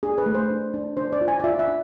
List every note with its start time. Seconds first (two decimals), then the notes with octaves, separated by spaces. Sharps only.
0.03 D4 G#4
0.18 B4
0.26 A3
0.35 C5
0.50 D4
0.74 D4
0.97 D4 C5
1.13 D5
1.21 F4
1.28 G#5
1.40 D5
1.44 F4 E5
1.59 E5
1.68 D4